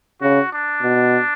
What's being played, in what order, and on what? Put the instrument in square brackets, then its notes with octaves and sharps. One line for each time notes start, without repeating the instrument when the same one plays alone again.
[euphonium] C#3 [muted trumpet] F#4
[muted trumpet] D4
[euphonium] B2